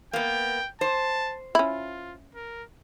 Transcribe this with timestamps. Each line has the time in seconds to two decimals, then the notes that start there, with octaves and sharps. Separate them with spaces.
0.13 A#3 B3 G5
0.81 C5 A5
1.55 C#4 E4 F4
2.35 A#4